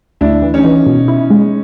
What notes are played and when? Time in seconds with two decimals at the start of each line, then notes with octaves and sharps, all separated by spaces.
0.21 D2 D4 E4
0.42 E3
0.54 C#4 D#4
0.65 E3
0.87 B2
1.08 E4
1.30 G#3